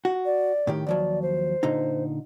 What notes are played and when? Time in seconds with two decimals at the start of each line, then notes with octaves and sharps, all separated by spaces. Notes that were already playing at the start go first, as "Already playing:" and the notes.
0.05 F#4
0.25 D5
0.67 A2 D#3 G4
0.87 D#2 F3 F#3 D5
1.22 C5
1.63 A#2 D3 D#4